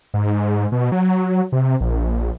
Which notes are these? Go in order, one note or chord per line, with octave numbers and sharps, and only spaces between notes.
G#2
B2
F#3
C3
A#1